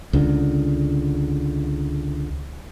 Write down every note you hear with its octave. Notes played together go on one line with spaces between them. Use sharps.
C#2 D3